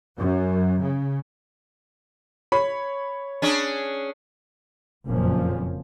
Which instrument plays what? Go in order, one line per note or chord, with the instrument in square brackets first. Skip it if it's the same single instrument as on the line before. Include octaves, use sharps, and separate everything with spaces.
[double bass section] F#2
C#3
[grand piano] C#5 B5
[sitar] C#4 D4 G#4
[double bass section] F#1 F2 A#2 F3 C#4